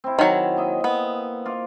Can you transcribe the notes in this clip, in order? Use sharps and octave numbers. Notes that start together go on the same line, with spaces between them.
C4 E4
D#3 F#3
A#3 D#5 E5
B3
F4 D6